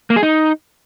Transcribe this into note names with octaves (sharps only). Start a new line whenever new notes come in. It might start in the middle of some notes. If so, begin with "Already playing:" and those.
A#3
G#4
D#4